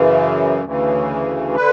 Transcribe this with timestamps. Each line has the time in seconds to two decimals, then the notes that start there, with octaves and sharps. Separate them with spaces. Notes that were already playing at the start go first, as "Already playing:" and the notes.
Already playing: F#2 C#3 E3
0.63 D2 C#3 E3
1.56 D3 B4